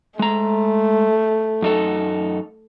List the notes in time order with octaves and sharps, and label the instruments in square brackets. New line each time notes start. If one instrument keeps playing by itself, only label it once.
[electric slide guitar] G#3 A#5 [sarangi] A3
[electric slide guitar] F#2 D#4 A4